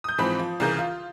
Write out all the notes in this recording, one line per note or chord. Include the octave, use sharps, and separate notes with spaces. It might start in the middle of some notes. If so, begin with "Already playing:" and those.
D#6 G6
G#2 E3 F3 C4 B5
F3
C2 C#3 E3 A#4 G6
F4